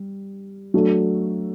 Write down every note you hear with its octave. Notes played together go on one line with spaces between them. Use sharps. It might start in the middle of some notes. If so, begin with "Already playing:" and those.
Already playing: G3
F#3 A3 D4